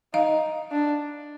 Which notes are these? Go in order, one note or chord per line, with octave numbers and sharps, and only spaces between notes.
D#4 D#5 F5
D4